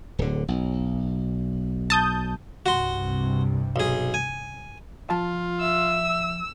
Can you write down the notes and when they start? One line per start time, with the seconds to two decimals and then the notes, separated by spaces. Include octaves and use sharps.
0.19 D1 D3
0.48 B1
1.90 A5 D#6 G6
2.66 C2 G2 C3 F#4 C6
3.76 B1 G#4
4.14 G#5
5.10 F3 F4 A5
5.61 E5 E6